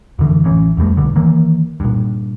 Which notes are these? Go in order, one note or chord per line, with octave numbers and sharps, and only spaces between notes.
F#2 D3 E3
A1 E3 C#4
F1 F2 G3 A3
B1 G2 D3
D#3 E3 A#3
G2 A#2